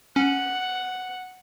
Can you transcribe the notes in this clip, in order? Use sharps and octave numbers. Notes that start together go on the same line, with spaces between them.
C#4 F#5